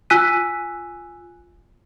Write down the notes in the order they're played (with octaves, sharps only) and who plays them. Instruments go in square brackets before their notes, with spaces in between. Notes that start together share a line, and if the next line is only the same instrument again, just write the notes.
[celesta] F4 G#5 E6 F#6 B6 D#7